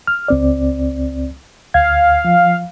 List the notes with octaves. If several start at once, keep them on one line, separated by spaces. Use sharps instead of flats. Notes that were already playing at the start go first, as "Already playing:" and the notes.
F6
C#2 C4 D5
D2 F5 G#6
F3